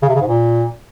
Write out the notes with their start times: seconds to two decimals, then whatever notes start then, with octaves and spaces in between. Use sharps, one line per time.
0.02 C#3
0.09 C3
0.15 C#3
0.21 G#2
0.28 A#2